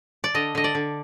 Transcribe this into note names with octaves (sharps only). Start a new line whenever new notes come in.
D5
D3 D#5
D3 D#5
D5
D3